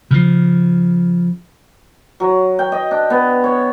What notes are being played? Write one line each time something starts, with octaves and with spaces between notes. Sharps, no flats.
C#3 F3
F#3
G5
D#5
D4
B3
C#5